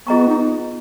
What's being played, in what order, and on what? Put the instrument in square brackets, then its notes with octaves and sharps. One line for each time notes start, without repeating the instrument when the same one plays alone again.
[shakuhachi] B3 [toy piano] F4 G#4 D#5 A#5 C#6
[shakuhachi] D#4